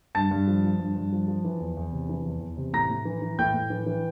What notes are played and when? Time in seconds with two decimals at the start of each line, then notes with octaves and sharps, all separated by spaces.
0.15 G2 A5 A6
0.31 G2
0.47 F3
0.64 F3
0.79 G2
0.96 G2
1.13 F3
1.28 F3
1.45 E3
1.60 E2
1.77 E2
1.92 C3
2.09 E3
2.26 E2
2.41 E2
2.57 C3
2.73 A2 A#5 A#6
2.90 A2
3.05 E3
3.22 E3
3.39 A2 G5 G6
3.54 A2
3.70 E3
3.86 E3